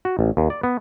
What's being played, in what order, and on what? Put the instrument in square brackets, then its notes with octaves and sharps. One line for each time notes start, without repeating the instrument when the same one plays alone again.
[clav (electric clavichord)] F#4
A1
D#2
D5
B3